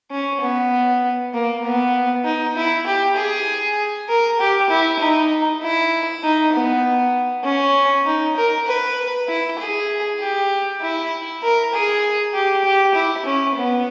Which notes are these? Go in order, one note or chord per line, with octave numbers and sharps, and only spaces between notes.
C#4
B3
A#3
B3
D#4
E4
G4
G#4
A#4
G4
E4
D#4
E4
D#4
B3
C#4
D#4
A#4
B4
E4
G#4
G4
E4
A#4
G#4
G4
G4
E4
C#4
B3